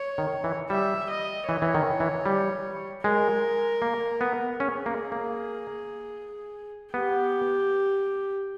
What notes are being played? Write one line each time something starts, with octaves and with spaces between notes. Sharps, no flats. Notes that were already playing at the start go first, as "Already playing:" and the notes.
Already playing: C#5
D#3
E3
G3 E5
D#5
E3 C#5
E3
D#3
E3
G3
G#3 A#4
A#3
B3
C#4 G#4
A#3
A#3
B3 G4